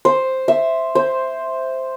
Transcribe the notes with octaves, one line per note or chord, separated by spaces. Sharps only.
C5
E5
C5